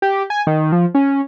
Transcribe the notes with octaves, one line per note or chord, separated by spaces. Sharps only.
G4
G#5
D#3
F3
C#4